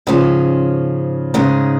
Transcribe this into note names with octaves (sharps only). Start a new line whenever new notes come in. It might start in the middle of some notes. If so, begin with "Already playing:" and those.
G#2 C#3 F3 C#4 G#4
G#2 C#3 G#3 D#4 G#4